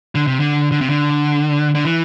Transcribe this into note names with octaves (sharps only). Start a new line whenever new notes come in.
D3
C3
D3
D3
C3
D3
D3
E3